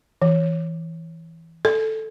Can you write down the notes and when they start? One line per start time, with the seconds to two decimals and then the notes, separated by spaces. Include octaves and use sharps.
0.22 E3
1.65 A4